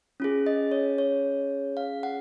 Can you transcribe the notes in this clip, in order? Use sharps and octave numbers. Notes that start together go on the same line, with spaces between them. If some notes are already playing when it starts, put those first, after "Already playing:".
C#4 F4 G#4
D#5
C#5
C#5
F5
F#5